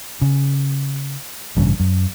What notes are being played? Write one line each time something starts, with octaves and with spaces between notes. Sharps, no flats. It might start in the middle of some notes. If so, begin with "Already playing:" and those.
C#3
A1 G2 C#3
F#2